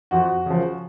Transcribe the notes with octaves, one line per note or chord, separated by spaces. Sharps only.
F2 F#4
C#3 F3